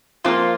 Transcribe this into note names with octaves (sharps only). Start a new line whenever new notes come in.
F3 A#3 D4 F4